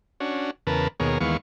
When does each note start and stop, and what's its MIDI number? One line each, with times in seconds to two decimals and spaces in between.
0.20 0.51 61
0.20 0.51 62
0.20 0.51 66
0.67 0.88 40
0.67 0.88 49
0.67 0.88 70
0.67 0.88 71
0.67 0.88 81
1.00 1.18 39
1.00 1.18 47
1.00 1.18 68
1.00 1.18 70
1.00 1.18 73
1.21 1.37 39
1.21 1.37 52
1.21 1.37 56
1.21 1.37 59
1.21 1.37 77
1.21 1.37 85